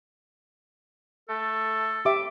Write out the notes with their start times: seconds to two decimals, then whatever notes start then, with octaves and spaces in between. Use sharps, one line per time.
1.29 A3 A4
2.05 G4 E5 D6